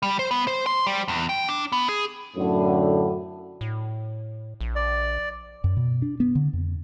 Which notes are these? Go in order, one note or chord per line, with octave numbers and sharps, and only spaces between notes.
G3
C5
B3
C5
C6
G3
E2
G5
D4
B3
G#4
F#2 A2 D3
A2
A#1
D5
F#2
B2
D4
B3
D3
F2